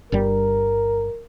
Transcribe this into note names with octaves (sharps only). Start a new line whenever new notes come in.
G1 G2 G3 A#4